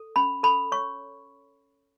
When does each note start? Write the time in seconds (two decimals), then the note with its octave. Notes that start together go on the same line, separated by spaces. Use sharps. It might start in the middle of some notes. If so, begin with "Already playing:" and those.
Already playing: A4
0.16 C#4 B5
0.43 A4 B5
0.72 C#5 C#6